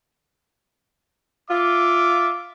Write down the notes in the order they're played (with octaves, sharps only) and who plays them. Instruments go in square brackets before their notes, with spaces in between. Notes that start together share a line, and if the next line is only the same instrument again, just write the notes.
[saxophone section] F4 [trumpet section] E5 D6